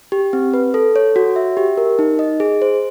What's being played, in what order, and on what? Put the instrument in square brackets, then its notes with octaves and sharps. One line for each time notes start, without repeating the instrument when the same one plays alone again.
[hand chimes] G4
C4
B4
A4
C#5
F#4
E5
G4
A#4
D#4
D#5
G#4
C5